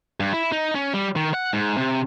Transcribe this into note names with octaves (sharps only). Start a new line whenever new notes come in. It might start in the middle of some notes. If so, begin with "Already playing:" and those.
G2
E4
D#4
C#4
G3
D#3
F#5
G#2
C3